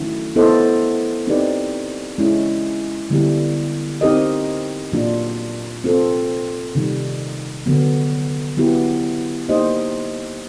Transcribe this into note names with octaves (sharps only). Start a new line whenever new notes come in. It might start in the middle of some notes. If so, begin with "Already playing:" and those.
Already playing: D#3 F#3 A3 C#4 E4
B3 E4 A4 C5 D#5
C4 D#4 G4 B4 D5
G#3 C#4 E4
D3 G3 B3 E4 G4
C4 D#4 G4 A#4 D#5
A#2 F#3 A#3 D4 F4
C4 F4 A4
C3 D#3 G3
D3 F#3 B3
F#3 B3 E4 G4
A#3 D#4 G4 C5 D#5